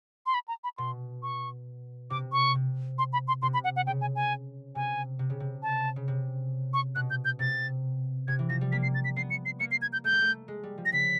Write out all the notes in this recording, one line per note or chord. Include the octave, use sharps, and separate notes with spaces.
C6
B5
A#5
B5
B2 C6
C#6
C3 D6
C#6
C3
C6
B5
C6
C3 C6
B5
F#5
F#5
C#3 G5
G#5
G#5
C3 G#5
C3
C#3
C3
A5
C#3
C3
C#6
B2 F#6
G6
G6
C3 A6
C3 G#6
E3
F3 A#6
G3
A#3 B6
C7
A6
B6
B3 C7
C#7
C7
A#3 C#7
C7
G#6
G6
A3 G6
A#3
A3
G#3
G3
F3
A#6
C#3 B6